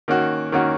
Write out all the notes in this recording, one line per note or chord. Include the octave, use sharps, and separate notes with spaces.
D#3 A#3 C#4 F#4
D#3 A#3 C#4 F#4